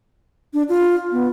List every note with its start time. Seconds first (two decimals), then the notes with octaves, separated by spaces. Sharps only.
0.54 D4
0.69 F4
1.12 B3